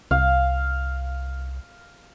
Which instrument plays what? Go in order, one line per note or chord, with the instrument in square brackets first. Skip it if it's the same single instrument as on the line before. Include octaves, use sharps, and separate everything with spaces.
[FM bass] C2 [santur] F5